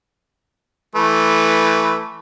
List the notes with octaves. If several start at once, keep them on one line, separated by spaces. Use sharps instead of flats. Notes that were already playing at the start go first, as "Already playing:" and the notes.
E3 A3 B4